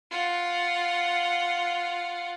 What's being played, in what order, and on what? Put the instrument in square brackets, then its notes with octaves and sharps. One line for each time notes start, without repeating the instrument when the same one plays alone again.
[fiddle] F4 F#5